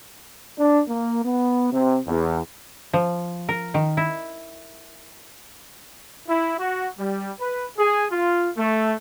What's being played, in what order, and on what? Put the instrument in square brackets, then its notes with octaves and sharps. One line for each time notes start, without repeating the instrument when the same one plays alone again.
[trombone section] D4
A#3
B3
C3
E2
[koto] F3
A#4
D#3
E4
[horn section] E4
F#4
G3
B4
G#4
F4
A3